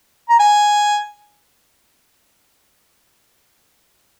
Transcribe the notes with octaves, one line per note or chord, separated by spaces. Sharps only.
A#5
G#5